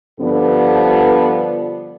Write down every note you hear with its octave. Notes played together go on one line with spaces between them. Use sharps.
G2 D3 F3 B3 D4 A4